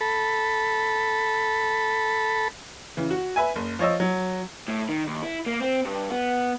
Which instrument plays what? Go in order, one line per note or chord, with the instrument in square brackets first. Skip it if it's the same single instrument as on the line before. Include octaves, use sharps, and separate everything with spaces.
[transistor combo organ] A4 B5
[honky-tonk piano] C#3 E3
F#4
B4 E5 G#5
F#1
F3 C#5 D#5 E6
F#3
[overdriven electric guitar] A2
D#3
D#2
E4
A#3
C4
G2
B3